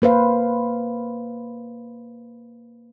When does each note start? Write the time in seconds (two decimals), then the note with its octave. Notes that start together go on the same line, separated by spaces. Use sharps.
0.02 A#3 B4 C5 F5